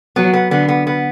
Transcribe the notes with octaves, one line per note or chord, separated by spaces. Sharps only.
F#3 B3
B3
D3 B3
B3
B3